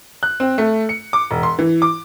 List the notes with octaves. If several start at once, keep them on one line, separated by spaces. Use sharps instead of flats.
F#6
C4
A3
C#7
D6
E1
C6
E3
D6